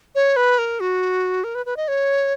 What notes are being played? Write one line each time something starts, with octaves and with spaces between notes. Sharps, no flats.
C#5
B4
A#4
F#4
A#4
B4
B4
D#5
C#5